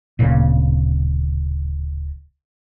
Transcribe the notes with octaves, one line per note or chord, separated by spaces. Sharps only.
D1 A#2 C#3